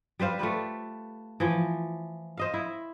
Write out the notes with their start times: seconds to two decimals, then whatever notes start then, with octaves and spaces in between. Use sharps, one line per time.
0.19 G3 B4 C5 F5
0.39 A3 F4 G4 B4
1.40 E3 F3
2.37 C5 D#5 F5
2.54 E4